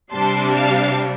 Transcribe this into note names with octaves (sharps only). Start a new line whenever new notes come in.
C3 G3 D4 A5 C6
F5 A5